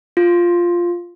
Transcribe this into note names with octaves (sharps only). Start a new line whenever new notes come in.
F4